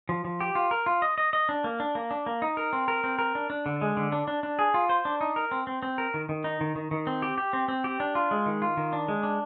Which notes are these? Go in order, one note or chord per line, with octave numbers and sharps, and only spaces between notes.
F3
F3
G4
F4
A#4
F4
D#5
D#5
D#5
D4
A#3
D4
A#3
D4
A#3
D#4
A#4
C4
A#4
C4
A#4
D4
D4
D3
G#3
D3
D4
D4
D4
G#4
F4
C5
D4
D#4
A#4
C4
C4
C4
A#4
D#3
D#3
D#4
D#3
D#3
D#3
C4
G4
G4
C4
C4
G4
D4
F4
G#3
D#3
F4
D#3
D4
G#3
D4